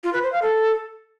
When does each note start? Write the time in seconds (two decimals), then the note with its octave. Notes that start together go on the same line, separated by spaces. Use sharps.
0.04 F4
0.13 B4
0.23 C5
0.32 F5
0.42 A4